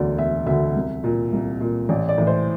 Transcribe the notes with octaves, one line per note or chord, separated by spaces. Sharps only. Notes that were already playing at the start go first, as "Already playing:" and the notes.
Already playing: E1 D2 D3 D5
E1 E5
D2 D3 E5
C2
A#2
C2
A#2
A1 D5
D5
A2 E3
C5